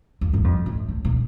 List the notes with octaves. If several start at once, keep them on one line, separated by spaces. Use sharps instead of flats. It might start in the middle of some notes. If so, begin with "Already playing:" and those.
F2
G2
F2
A2
A2
A#2